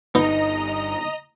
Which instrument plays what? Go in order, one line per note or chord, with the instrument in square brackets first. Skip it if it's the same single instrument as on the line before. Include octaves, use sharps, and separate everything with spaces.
[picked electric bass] G1 [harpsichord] B3 [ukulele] D#4 [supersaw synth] D#5 A#5